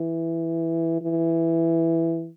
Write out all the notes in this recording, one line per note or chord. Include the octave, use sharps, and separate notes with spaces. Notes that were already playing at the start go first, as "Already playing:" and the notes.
Already playing: E3
E3